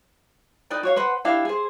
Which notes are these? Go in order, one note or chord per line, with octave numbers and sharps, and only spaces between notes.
D#4 B4 D5 G5
F#4 C#5 F5
B4 C5 F#5
D4 E4 G4 F5
G#4 C5